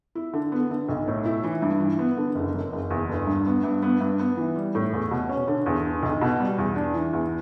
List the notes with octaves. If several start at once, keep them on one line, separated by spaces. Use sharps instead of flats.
E4
D3
B3
D3
B1
A2
E4
E3
G2
E3
B3
D3
F#1
F#2
F#1
E2
G1
G2
B3
G2
B3
G2
B3
E3
G3
A2
E2
B2
C#4
D3
E2
D3
B1
B2
G3
E2
D4
E3
E2